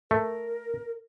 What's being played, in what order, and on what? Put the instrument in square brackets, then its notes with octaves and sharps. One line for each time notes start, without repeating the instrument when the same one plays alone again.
[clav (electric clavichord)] A3 [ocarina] A#4